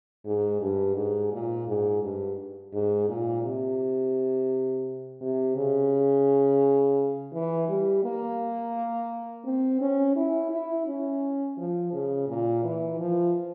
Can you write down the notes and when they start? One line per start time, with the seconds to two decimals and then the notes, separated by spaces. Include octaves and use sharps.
0.26 G#2
0.61 G2
0.96 G#2
1.32 A#2
1.67 G#2
2.02 G2
2.73 G#2
3.09 A#2
3.44 C3
5.21 C3
5.56 C#3
7.33 E3
7.68 G3
8.04 A#3
9.45 C4
9.81 C#4
10.16 E4
10.51 E4
10.87 C#4
11.58 F3
11.93 C#3
12.28 A#2
12.64 E3
12.99 F3